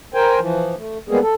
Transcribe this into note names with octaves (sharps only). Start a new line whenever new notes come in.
A#4 C5 G5 G#5
E3 F3
A3
B2 G3 G#3 A#3 B3 G#4
A4